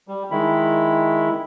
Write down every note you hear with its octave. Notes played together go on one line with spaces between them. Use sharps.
G3
D#3 G#3 E4 B5